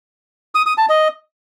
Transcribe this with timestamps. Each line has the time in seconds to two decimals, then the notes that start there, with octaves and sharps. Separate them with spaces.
0.55 D#6
0.66 D#6
0.78 A5
0.89 D#5